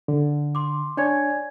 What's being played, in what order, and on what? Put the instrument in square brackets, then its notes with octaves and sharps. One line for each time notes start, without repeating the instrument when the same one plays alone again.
[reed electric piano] D3
[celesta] C6 D6
[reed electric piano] D4 C#5 [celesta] D5 G#5 G#6